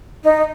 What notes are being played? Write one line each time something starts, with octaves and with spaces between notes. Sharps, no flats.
D#4